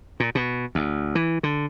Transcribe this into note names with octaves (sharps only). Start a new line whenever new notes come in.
A#2
B2
D2
E3
D3